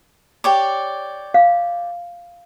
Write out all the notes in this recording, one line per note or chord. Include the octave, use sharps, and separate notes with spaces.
G4 C#5 D5
F5